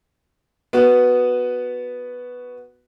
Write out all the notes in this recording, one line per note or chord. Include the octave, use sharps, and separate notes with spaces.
B3 F#4 B4